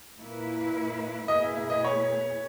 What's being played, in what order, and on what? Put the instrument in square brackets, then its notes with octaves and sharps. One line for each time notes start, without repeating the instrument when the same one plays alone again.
[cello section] A#2 A#3 E4 B4
[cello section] B2 A#3 E4 G#4 B4 [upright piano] D#5
[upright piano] E5
E5
D#5
C#5